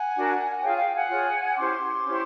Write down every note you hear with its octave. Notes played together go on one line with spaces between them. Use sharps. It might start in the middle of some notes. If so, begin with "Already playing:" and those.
Already playing: F#5 G#5
D4 F#4 A#4
F4 G#4 C#5 F5 G5
F5 G5
F#5 G#5
F4 G#4 C#5
C#4 E4 G4 C5 C6 D6
C#4 E4 G4 C5